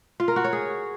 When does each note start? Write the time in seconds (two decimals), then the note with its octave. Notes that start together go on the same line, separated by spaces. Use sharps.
0.20 F4
0.28 A#4
0.36 F#4
0.44 C#5
0.53 G#4